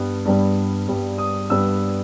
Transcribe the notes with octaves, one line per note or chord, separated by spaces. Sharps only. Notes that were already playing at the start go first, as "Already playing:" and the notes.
Already playing: G2 G3 B3
G2 G3 B3
G2 G3 B3
D#6
G2 G3 B3 E6